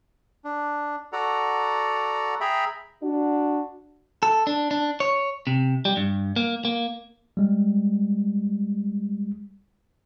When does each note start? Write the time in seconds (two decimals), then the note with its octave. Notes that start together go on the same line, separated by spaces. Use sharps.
0.45 D4
1.13 F#4 A4 D5 F#5 A#5
2.41 G#4 E5 G5 A#5 B5
3.03 D4 F#4
4.23 A4
4.47 D4
4.71 D4
5.00 C#5
5.47 C3
5.85 G3
5.97 G2
6.36 A#3
6.65 A#3
7.37 G3 G#3